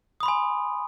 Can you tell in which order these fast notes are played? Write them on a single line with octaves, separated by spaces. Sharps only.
D#6 B5 C6 G#5